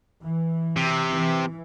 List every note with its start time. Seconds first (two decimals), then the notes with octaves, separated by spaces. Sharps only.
0.24 E3
0.77 C3
1.14 E3